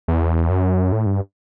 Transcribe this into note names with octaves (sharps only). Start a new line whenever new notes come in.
E2
F#2
A2
G2